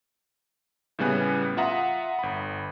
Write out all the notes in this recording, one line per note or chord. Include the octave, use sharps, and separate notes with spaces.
A2 C#3 G3 B3 G#5 F#6
F4 E5 F#5 A#5 D#6
G1 B5